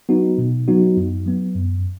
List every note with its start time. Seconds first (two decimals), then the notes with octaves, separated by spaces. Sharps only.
0.09 F#3 B3 D#4 F#4
0.38 B2
0.68 F#3 B3 D#4 F#4
0.97 F#2
1.26 F#3 B3
1.56 F#2